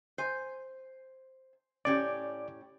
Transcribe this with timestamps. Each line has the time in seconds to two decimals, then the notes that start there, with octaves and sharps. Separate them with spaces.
0.18 C5 G#5
1.85 A2 C#4 G4 D5